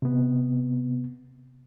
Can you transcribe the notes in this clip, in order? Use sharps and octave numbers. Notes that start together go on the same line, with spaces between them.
C3 B3